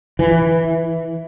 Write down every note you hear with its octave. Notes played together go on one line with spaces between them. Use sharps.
E3